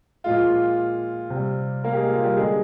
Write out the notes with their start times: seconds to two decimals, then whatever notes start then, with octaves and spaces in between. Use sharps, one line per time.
0.24 A#2 F3 G#3 F4
1.30 C3
1.35 G3
1.84 A#3 A#4
1.93 G4
1.97 G#3 G#4
2.11 F4
2.24 G3 G4
2.36 D3 G3 G#3 G#4